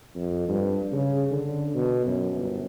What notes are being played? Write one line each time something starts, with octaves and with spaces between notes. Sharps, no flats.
F2
G2
C#3
D3
B2
F#2
G1